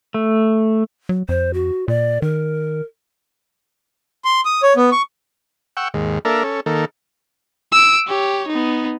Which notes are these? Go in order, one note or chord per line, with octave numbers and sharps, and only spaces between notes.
A3
F#3
F2 C5
F#4
A#2 D5
D#3 A#4
C6
D#6
C#5
B3
C#6
F#5 G5 C#6 E6
D#2 G#2
A#3 D4 A4 A#4 E5
C#4 A4
D#3 A#3 A4
E6 D7
G4 C#5
B3 D#4